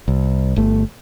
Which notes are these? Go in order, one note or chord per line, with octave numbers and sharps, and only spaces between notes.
C2
G1 A3